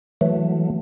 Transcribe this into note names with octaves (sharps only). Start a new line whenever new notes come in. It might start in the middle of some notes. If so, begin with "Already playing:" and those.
E3 F#3 A3